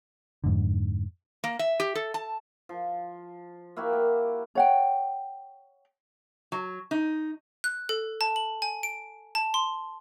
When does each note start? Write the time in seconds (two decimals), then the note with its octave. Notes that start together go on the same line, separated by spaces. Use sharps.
0.44 F2 G#2 D3
1.44 A#3
1.59 E5
1.80 G4
1.95 A4
2.14 A5
2.69 F3
3.77 A#3 E4 F#4 G4
3.93 A#3
4.55 C#5 F#5 G5
6.52 F#3
6.91 D#4
7.64 F#6
7.89 A4
8.21 A5
8.36 F#7
8.62 G#5
8.83 D7
9.35 A5
9.54 C6